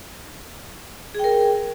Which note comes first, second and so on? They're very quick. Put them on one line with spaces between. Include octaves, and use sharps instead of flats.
G#4 G5 A#4